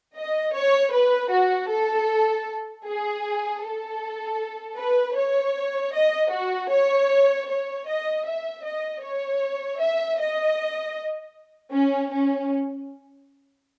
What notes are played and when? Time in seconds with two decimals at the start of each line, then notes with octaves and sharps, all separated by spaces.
0.15 D#5
0.54 C#5
0.92 B4
1.31 F#4
1.69 A4
2.85 G#4
3.63 A4
4.78 B4
5.17 C#5
5.94 D#5
6.32 F#4
6.71 C#5
7.49 C#5
7.87 D#5
8.25 E5
8.65 D#5
9.03 C#5
9.80 E5
10.20 D#5
11.73 C#4
12.12 C#4